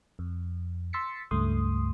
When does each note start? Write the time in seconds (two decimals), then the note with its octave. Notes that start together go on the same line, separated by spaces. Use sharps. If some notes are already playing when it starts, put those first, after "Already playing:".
0.19 F2
0.93 C6 E6 A6 B6 C#7
1.31 C#2 G2 A3 C6 D#6